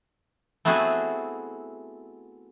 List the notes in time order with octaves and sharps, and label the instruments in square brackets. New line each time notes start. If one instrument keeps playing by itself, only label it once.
[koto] A3 B3 C4 E4 F#4 G#4